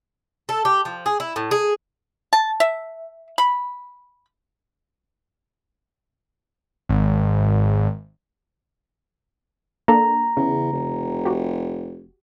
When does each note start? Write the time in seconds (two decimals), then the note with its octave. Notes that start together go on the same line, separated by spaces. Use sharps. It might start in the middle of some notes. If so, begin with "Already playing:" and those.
0.49 A4
0.65 G4
0.85 F3
1.06 G#4
1.20 E4
1.36 A2
1.51 G#4
2.33 A5
2.60 E5
3.38 B5
6.89 G#1
9.88 A#3 D4 A4 A#5
10.37 E2 C#3
10.73 F1
11.25 F#4 G4